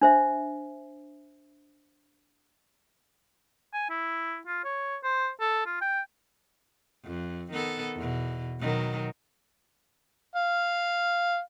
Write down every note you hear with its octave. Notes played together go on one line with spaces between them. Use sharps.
D4 C5 E5
G#5
E4
F4
C#5
C5
A4
F4
G5
F2
D#3 B3 A4
E2 B2
B2 D#3 F#3
F5